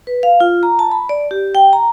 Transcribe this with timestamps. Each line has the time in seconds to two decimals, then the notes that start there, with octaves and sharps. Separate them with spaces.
0.07 B4
0.23 F5
0.40 F4
0.63 A#5
0.79 A5
0.91 B5
1.09 D5
1.31 G4
1.55 G5
1.73 A#5